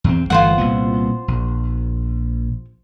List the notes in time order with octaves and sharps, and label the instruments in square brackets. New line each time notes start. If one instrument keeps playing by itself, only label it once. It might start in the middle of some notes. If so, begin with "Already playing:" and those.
[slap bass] E2 C4
[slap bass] G1 E3 A3 [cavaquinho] F4 C5 F#5
[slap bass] C2 A#2 B3
A#1